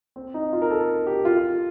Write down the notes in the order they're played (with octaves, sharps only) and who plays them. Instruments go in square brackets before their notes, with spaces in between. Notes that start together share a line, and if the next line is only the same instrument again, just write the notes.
[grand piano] C4
D#4
F4
A#4
A4
G4
F4